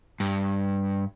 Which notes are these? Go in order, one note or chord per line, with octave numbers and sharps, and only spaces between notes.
G2